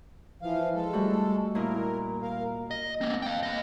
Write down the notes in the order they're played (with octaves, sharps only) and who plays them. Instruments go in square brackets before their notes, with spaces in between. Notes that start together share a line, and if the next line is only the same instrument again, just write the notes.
[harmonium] E3 F3 F5
G#3 A4
[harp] G3 A3 F#4
[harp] A#2 E4 D#5 [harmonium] A#4
[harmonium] A#4 F5
[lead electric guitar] D#5
A#3 C4
F5 G5
A#3 D#5